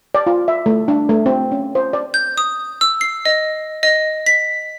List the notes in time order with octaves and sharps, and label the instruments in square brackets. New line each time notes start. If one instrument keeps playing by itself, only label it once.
[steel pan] D5
F4
E5
A3
D4
A3
C4
C#4
C5
D5
[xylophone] G6
D#6
E6
C7
D#5
D#5
B6